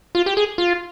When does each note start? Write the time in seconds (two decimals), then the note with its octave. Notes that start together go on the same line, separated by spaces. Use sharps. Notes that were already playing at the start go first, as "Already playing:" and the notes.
0.15 F4
0.26 G4
0.37 G#4
0.58 F4